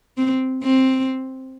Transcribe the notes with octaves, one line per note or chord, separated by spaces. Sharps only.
C4
C4